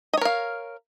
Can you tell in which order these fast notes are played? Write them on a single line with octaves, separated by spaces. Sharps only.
D#5 C#5 A#4 F5